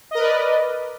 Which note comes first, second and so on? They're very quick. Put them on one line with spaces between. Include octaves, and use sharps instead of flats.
D#5 A#4 B4 D5